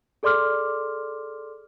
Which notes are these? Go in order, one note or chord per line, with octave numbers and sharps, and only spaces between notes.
G#4 A4 D5 C6 D6 F6